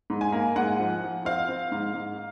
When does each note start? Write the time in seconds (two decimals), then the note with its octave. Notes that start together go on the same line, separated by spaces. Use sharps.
0.10 G#2
0.21 G#5
0.32 A#3
0.56 G#2 F#5
0.79 F3
1.02 F3
1.25 C4 F5
1.49 C4
1.72 G#2
1.95 G#2